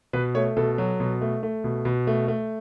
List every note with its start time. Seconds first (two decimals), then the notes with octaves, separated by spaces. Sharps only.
0.13 B2 B4
0.35 A3 C#5
0.57 B2 A4
0.78 F#3
1.00 B2
1.21 A3
1.43 A3
1.64 B2
1.85 B2
2.07 A3
2.28 A3